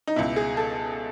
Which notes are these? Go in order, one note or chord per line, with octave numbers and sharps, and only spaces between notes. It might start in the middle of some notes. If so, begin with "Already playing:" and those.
D#4
C#2 B2 E4
G#4
A4